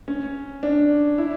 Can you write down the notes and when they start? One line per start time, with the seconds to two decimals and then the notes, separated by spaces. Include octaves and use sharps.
0.08 C#4
0.63 D4
1.18 E4